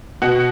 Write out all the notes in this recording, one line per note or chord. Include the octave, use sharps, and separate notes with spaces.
B2 F#4